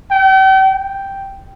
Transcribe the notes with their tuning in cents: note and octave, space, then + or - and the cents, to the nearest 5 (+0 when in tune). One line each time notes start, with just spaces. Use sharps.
G5 -40
G5 +0